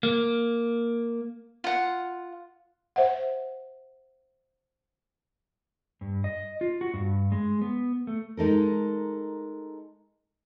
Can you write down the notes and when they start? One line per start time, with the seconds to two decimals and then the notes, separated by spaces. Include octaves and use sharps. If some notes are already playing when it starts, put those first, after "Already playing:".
0.03 A#3
1.64 F4 F#5
2.96 C5 E5 F#5
6.01 G2
6.24 D#5
6.61 F4
6.81 F#4
6.94 G2
7.32 G#3
7.62 B3
8.07 A3
8.37 G#3 D#4 A4 A#4